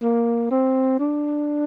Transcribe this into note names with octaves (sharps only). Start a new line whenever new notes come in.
A#3
C4
D4